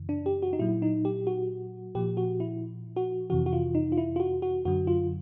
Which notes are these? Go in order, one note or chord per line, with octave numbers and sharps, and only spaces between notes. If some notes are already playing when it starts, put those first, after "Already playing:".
Already playing: F#2 C#3 E3
D4
G4
F#4
D#4
A#2 F#3 E4
D#4
G4
F#4
A#2 F3 G4
F#4
E4
F#4
F2 C3 E3 F#4
F#4
F4
D#4
F4
E4
F4
F#4
F#4
F#2 D3 F#3 F#4
F4